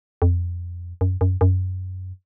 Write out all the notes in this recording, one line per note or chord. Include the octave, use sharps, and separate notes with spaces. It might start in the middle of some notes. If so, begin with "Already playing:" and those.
F2
F#2
F#2
F#2